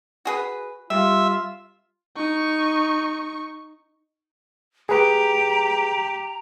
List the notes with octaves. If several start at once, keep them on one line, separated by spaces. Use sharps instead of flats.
F#4 G#4 B4
C3 G3 F4 E5
D#4 C#6
G4 G#4 B4 A#5